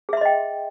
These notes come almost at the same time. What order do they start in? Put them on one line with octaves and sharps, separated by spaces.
G#4 E5 C6 D#5 G5